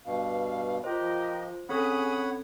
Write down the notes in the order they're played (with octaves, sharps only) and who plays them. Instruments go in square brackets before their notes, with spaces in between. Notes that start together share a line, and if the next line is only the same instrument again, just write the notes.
[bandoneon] G2 B2 [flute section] F5
[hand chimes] F4 C5 [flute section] G4 A#4 D#5
[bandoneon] F3
[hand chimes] C4 C#4 A4 [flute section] G#4 D#6 [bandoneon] C#5 F#5 B5